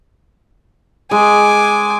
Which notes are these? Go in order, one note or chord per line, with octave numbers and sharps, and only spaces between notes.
G#3 G#5 D6